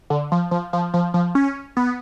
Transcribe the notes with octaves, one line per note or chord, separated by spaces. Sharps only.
D3
F3
F3
F3
F3
F3
C#4
B3